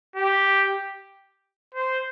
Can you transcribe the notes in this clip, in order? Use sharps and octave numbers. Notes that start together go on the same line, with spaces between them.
G4
C5